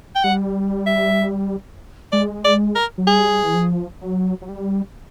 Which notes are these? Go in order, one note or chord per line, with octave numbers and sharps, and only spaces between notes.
G5
G3 F#5
E5
G#3 D5
D5
A#4
F#3
G3 G#4
E3
F3
F#3
F#3
G3